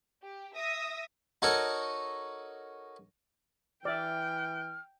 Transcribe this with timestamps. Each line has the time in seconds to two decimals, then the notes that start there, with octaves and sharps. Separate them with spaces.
0.23 G4
0.55 E5 D#6 A#6
1.42 D#4 F#4 A4 A#4 C#5 D#5
3.85 E3 D5 E5 G5 F6